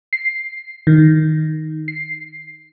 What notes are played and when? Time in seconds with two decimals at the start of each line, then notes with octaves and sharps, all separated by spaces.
0.13 C7
0.87 D#3
1.88 C7